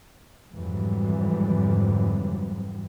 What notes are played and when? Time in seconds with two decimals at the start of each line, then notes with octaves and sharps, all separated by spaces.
0.51 F2 G#2 D3 E3 F#3 G3